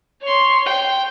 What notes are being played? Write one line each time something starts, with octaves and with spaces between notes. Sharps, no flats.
C#5 C6
G5